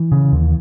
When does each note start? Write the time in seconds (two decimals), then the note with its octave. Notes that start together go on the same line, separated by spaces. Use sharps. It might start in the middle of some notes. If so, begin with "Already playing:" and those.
Already playing: E3
0.12 C#3
0.32 D#2